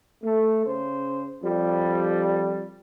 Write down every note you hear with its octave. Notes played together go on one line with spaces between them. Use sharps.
A3
C#3 C5
F2 F3 G3